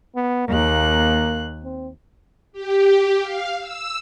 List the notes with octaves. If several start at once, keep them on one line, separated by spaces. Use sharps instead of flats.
B3
D#2 A#3 F#6
C4
G4
F5
E6